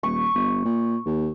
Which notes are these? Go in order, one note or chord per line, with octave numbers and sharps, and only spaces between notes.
D#1 C#6
G1
A#2
D#2